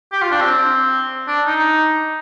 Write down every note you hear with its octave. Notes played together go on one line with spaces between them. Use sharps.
G4
F4
D4
C4
D4
D#4